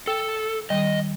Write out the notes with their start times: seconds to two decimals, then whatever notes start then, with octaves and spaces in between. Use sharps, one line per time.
0.07 A4 G5 E6
0.70 D#3 G3 D#5